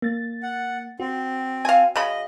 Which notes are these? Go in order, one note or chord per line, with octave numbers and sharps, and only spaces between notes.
A#3 A6
F#5
C4 F#4
F5 G#5
C#3 D#5 B5